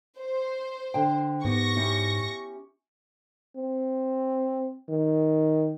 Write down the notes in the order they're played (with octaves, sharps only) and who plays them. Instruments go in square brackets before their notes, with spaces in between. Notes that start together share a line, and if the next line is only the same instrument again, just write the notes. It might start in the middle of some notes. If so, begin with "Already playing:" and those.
[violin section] C5
[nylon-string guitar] D3 G5
[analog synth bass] G#2 [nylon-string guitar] B3 G4 [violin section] C#6 A#6
[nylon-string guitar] C#4 E4 G4
[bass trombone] C4
D#3